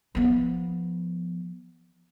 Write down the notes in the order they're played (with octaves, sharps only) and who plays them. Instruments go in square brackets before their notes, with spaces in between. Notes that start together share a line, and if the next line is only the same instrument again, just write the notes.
[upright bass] F3 B3